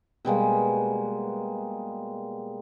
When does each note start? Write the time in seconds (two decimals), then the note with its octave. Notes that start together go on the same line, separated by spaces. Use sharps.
0.25 B2 G3 G#3 A#3